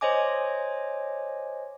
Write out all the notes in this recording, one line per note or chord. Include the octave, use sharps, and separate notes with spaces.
C5 C#5 D#5 G#5 D6